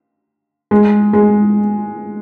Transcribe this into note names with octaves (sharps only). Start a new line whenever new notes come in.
G#3
G#3